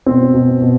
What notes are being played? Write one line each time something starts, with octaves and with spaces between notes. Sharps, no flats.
B2 C4
B2
B2